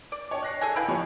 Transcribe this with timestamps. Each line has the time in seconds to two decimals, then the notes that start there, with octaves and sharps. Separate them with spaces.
0.12 D5
0.31 C#5 G5 A5
0.43 F#6 A#6 C7
0.61 G#4 A4 G#5
0.76 E4 B4 F5 G5
0.88 F3 G4 C#5